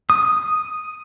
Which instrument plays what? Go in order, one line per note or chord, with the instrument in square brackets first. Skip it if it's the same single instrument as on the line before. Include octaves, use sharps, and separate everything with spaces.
[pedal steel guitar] D#6